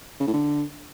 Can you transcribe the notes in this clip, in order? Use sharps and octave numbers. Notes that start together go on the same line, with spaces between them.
C#3
A2
D3